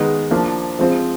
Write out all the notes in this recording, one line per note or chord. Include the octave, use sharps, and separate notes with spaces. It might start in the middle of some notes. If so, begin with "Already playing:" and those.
Already playing: D#3 G#3 B3
F3 A#3 D4
F3 G#3 C4 F4